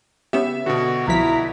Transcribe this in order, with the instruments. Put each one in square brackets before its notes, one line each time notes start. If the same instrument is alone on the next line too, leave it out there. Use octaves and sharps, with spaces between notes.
[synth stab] C#3 B3 G4 [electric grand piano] E5 E7
[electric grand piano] B2 D3 [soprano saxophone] F#4
[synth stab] C2 F3 B6 [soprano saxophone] E4 [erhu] A#5